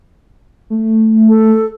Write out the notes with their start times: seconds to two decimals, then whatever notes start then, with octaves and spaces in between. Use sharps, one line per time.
0.70 A3
1.29 A4